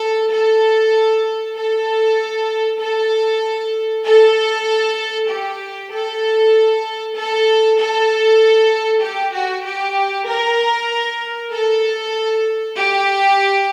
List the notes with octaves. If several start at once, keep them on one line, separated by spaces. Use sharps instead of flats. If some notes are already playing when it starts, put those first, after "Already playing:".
Already playing: A4
A4
A4
A4
A4
G4
A4
A4
A4
G4
F#4
G4
A#4
A4
G4